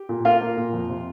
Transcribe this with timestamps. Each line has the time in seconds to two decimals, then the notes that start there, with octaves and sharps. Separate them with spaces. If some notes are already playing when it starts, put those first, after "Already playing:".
Already playing: G4
0.09 A#2
0.25 A#3 F4 F5
0.41 A#3
0.57 A#2
0.73 F2
0.89 C3